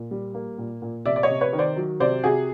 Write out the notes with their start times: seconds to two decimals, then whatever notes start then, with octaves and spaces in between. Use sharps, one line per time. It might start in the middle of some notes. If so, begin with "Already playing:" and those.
Already playing: A#2
0.11 G3
0.34 A#3
0.58 A#2
0.82 A#2
1.05 C3 D5 E5
1.16 D5
1.23 C#5 D#5
1.29 C3
1.41 B4 C#5
1.53 D#3
1.59 C5 D5
1.77 F#3
2.00 C3 C5 D5
2.24 C3 F#4 G#4